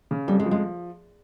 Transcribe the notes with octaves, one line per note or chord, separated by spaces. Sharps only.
C#3
F2 G3
G#3
F3
G#3